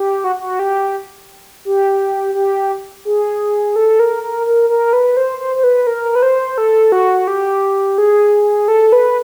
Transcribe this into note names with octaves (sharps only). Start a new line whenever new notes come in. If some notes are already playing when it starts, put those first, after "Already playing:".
Already playing: G4
F#4
F#4
G4
G4
G4
G#4
A4
A#4
A#4
A#4
A#4
B4
C5
C5
C5
B4
A#4
B4
C5
A4
F#4
G4
G#4
A4
B4